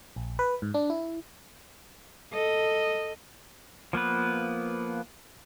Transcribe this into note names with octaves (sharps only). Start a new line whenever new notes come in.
A#1
B4
G#2
D4
E4
A4 D#5
F3 A#3 B3 B4